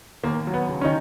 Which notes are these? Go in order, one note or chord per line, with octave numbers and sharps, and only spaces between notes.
D#2 A#3
F#3
B3
C#3
C#4
D#3 D#4